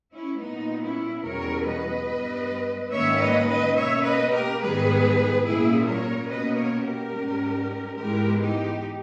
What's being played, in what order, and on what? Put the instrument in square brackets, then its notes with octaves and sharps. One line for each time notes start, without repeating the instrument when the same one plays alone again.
[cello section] C#4 E4
A#2 G3 B3 D#4
C#4 E4
E2 B2 G3 C#4 A#4 C#5
B4 D#5
G2 G3 B3
G#2 D#3 G3 A#3 C#4 C#5 E5
B4 D#5
B4 D#5
B2 A#3 C#4 C#5 E5
B4 D#5
G4 A#4
G#2 D#3 G3 B3 G#4 B4
A#2 G3 A#3 C#4 E4 G#4
A#4 C#5
B2 A#3 C#4 B4 D#5
A#4 C#5
G4 A#4
G#2 G3 C#4
G#2 E3 G#3 B3 G4 A#4
D#4 G4